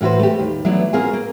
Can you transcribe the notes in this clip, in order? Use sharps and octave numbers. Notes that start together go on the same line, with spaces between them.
A2 E3 F#4 B4 C5
A3 G4
D#2
E3 F#3 A3 B3 D4 E4
A#3 C4 F4 F#4 G#4 G#5
A#3